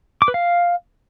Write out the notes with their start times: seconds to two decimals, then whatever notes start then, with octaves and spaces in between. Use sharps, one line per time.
0.22 D6
0.28 B4
0.34 F5